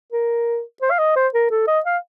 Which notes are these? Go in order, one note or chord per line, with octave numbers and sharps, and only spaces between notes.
A#4
C5
F5
D#5
C5
A#4
A4
D#5
F5